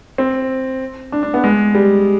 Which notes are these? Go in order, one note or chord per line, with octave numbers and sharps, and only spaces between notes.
C4
D4
D4
B3
G#3
G3